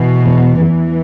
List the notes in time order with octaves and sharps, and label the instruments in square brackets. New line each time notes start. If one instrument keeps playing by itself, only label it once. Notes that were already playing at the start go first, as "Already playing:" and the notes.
Already playing: [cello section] B2 [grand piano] E3
[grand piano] E2
[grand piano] E2 [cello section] E3